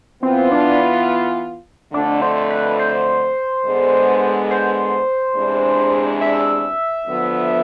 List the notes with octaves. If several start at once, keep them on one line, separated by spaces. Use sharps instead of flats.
E3 B3 C4 F4
D4
F2 D3 A3 D4
C5
B4
C5
D3 G#3 B3
C5
E2 C3 G#3 D4
E5
D2 D3 F3 B3